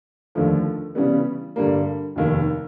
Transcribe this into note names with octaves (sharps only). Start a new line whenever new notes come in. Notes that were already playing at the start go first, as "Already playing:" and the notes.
D#2 D3 F3 A3
C#3 E3 G3 B3
G2 D3 G3 A#3
F1 D#2 D#3